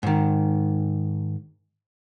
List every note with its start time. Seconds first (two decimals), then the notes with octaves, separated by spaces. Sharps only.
0.03 G#2 D#3